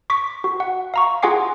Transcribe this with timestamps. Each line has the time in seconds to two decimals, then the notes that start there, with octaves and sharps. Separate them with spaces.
0.10 C#6 D6 B6
0.44 F#4
0.60 F#5
0.94 F5 A#5 C#6
1.23 F4 G#4 F#5 G#5 D6 C7